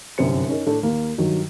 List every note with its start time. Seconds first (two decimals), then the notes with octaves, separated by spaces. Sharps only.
0.18 G1 C2 F#2 C3 C4 C#7
0.49 C#4 D#4 A#4
0.66 A2 A3 D4
0.83 D#2 A#3
1.18 G2 D#3 F#3